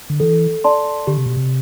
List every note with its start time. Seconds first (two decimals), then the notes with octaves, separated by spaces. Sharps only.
0.10 D3
0.20 E3 A4
0.64 D5 A5 C6
1.07 D3 G4
1.17 C3
1.26 B2
1.37 C3